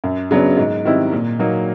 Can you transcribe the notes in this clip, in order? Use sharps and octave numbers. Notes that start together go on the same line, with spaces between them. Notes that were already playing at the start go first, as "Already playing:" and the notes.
F#2
C#3 F#3 B3 D4
G#2
D#3 G3 C4 E4
A#2
F#3 A#3 D#4